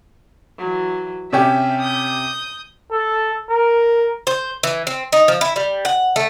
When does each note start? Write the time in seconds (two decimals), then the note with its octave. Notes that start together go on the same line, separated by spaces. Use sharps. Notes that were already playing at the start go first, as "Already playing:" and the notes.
0.58 E3 F#3
1.33 C3 C#4 G4 E5
1.82 D#6 G6
2.92 A4
3.50 A#4
4.27 C5
4.63 E3
4.87 C4
5.12 D#4
5.28 F3
5.41 E4
5.56 G3
5.85 F#5
6.16 A3